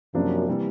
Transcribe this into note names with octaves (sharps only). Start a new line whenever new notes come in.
F#2 C3 F3 A#3 D4
C3 E3 G3 A#3